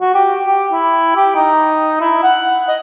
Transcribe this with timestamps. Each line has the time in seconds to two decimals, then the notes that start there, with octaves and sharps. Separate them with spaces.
0.01 F#4
0.14 G4
0.44 G4
0.72 E4
1.15 G4
1.35 D#4
2.01 E4
2.23 F#5
2.68 D#5